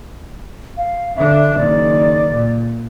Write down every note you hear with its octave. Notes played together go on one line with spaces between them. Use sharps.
F5
D3 D4 E5
F#1 D#3 D5
A#2